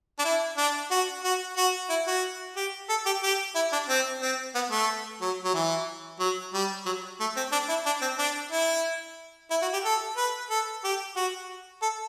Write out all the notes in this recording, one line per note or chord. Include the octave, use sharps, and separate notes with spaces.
D4
E4
D4
F#4
F#4
F#4
E4
F#4
G4
A4
G4
G4
E4
D4
C4
C4
B3
A3
F#3
F#3
E3
F#3
G3
F#3
A3
C4
D4
E4
D4
C4
D4
E4
E4
F#4
G4
A4
B4
A4
G4
F#4
A4